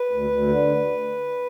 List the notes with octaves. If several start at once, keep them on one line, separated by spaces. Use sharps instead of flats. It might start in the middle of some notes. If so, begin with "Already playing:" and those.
Already playing: B4
D2
D2
D3